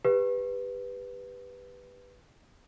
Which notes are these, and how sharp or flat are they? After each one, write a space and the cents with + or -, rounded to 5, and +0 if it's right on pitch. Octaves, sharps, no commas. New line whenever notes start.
G4 +25 B4 +0